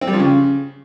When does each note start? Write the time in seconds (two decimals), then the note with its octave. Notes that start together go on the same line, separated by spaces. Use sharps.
0.01 C4
0.07 G3
0.13 F3
0.19 C#3